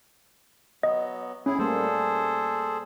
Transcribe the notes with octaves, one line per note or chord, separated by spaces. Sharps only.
F#3 B3 D#5
A2 C#4 E4 G#4
G3 A3 A#3 G#4 A4 C5